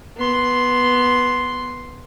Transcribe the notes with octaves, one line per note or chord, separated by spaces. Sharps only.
B3 C6